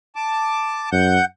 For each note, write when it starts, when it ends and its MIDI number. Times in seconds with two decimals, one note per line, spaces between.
0.16 0.90 81
0.16 0.90 86
0.92 1.18 42
0.92 1.25 78
0.92 1.25 91